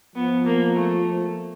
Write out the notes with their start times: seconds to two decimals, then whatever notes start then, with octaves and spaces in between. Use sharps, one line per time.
0.15 F3 B3
0.46 A#3
0.76 A3